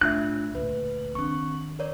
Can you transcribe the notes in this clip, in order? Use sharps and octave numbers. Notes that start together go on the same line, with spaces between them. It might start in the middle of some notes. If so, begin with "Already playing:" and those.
A2 D4 F4 E5 F#6
D2 A#2 B4
D#3 C4 D4 C#6
A#4 C#5 D5